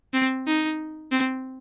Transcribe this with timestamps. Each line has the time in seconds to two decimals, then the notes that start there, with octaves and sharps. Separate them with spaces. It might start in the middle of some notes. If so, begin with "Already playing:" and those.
0.14 C4
0.47 D#4
1.12 C4